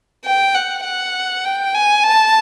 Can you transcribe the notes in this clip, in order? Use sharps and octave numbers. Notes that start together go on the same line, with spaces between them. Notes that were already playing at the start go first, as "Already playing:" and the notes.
G5
F#5
F#5
G5
G#5
A5